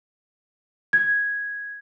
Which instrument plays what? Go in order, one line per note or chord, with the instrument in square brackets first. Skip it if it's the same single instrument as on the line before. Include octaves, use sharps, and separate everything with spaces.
[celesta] G#6